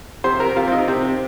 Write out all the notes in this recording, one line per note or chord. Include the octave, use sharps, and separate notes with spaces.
C3 C5
A#4
C3 F4
C4
D#4
C3 C4